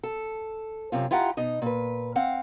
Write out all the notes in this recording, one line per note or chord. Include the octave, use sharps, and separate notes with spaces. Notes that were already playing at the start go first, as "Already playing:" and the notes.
A4
F#2 C3 F4
E4 F4 G4 F#5 A5 A#5
B2 D#4 D#5
A#2 B4
C4 F5 F#5